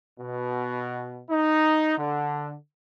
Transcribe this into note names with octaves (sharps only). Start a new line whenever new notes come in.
B2
D#4
D3